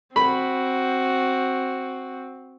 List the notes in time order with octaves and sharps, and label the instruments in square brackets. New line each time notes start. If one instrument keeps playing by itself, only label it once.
[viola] C4 F#4 [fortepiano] B5